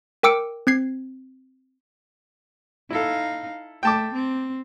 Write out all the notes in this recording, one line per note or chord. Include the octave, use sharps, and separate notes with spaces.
A#4 G5 D6 E6 C#7 D7
C4 G#6 C7
D#4 E4 A4 F5
A3 G5 A5 D6
C4